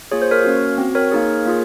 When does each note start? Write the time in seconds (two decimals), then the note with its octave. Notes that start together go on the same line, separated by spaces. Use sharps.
0.11 A#3 F4 G#4 C#5
0.22 C5
0.31 A#4 C#5
0.45 A#3 C#4 F#4
0.78 C4 F#4
0.95 A#4 C#5
1.12 A#3 D#4 G#4
1.45 A#3 F4 G#4